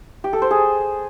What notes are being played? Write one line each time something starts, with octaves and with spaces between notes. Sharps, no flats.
G4
A4
C5
G#4